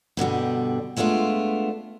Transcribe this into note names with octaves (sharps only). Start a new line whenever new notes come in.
G2 B2 D3 G3
G#3 A3 B3 D4 F4